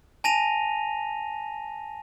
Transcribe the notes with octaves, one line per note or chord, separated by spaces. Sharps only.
G#5 A5 A#6 D#7 F7